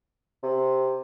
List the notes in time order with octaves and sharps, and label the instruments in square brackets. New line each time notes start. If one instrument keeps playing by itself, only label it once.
[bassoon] C3